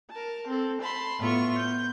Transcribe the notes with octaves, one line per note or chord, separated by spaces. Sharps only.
A#4 A5
C4 A4
A5 B5 C6
A2 B3 F4 E5 C#6
B3 G6